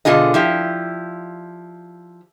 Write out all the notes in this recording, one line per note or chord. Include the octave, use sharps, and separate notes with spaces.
B2 D3 F4 G#4 D#5
F3 E4 G4